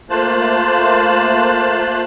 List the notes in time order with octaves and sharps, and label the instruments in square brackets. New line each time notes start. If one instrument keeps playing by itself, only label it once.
[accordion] A3 A#3 F4 C5 A5 F#6